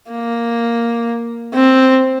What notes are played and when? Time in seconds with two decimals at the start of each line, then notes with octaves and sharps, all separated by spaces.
0.11 A#3
1.54 C4